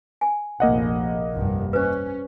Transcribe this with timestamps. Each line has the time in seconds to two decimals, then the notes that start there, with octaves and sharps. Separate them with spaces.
0.21 G#5
0.60 F1 A#1 A#3 D#5 F#5
1.32 F1 C2 G2
1.73 C#4 B4 C5